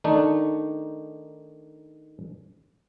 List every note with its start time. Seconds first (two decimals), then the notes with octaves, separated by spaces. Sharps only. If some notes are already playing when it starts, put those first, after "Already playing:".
0.04 D#3 A3 D4 D#4